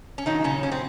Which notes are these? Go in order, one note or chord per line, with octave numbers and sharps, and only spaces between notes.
C#4
A#2 D#3 F#3 D#4
C#3 C#4
C#4
C4